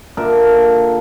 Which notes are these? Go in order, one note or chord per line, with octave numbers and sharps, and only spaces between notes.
A#2 D3 A#4 E5